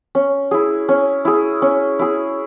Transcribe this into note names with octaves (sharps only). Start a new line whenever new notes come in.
C#4
E4 G#4
C#4
E4 G#4
C#4
E4 G#4